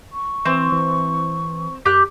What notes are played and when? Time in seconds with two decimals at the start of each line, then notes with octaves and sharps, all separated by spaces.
0.13 C#6
0.45 E3 C4
0.72 E3
1.86 F#2 G4 F#6